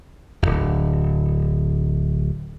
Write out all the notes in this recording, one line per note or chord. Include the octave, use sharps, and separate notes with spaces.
D1 G#1